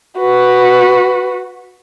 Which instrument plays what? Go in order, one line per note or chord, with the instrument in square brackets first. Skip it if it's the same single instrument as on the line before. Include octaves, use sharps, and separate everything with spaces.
[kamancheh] F#4 B4